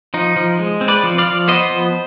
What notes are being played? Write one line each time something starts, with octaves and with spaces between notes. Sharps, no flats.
F3 D#4
F3
G#3
C4
B4 D5
F3
D5 F5
F3
B3 C5 D#5
F3